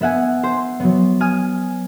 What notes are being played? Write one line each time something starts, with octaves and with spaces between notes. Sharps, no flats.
B3 E5 F#5 G#5
C5
F#3 B3
G#5 D#6 F6